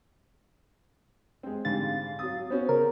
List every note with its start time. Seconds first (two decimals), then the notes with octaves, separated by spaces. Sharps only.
1.43 G#3 C4
1.65 G#2 D3 G3 F5 A6
2.19 F#3 D#6
2.50 B3 C#4 F#4 C5
2.69 C#3 A#4